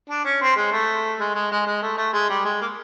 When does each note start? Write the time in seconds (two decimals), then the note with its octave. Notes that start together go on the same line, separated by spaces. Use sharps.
0.10 D4
0.25 C#4
0.42 C4
0.56 G#3
0.72 A3
1.20 G#3
1.35 G#3
1.51 G#3
1.66 G#3
1.82 A3
1.97 A3
2.14 G#3
2.29 G3
2.45 G#3
2.61 A#3